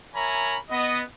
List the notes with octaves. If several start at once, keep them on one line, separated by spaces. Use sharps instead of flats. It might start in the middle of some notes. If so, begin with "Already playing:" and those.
A#4 C#5 E5 G#5 A#5 B5
B3 D#5